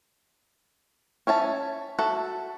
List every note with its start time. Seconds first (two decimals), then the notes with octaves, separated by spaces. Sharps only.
1.27 C#4 C#5 E5 A5
1.99 F#4 A4 E5 F#5